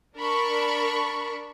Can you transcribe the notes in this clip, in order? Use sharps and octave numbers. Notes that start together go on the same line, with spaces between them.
D4 A#4 A5 B5 C#6